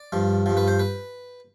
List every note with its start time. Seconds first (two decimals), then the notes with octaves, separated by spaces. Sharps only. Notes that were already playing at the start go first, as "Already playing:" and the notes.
Already playing: D5
0.12 G2 F3
0.46 G2 F3
0.57 B4
0.68 C5
0.79 B4